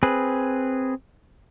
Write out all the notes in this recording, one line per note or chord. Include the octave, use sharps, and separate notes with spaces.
C4 G#4 B4